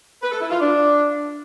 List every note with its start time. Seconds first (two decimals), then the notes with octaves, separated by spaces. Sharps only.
0.22 B4
0.31 A4
0.41 E4
0.50 F4
0.60 D4